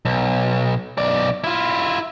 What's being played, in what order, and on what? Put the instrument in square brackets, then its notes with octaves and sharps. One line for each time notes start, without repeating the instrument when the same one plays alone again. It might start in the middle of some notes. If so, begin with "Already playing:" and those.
[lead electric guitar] B1
B1 D5
E4 F4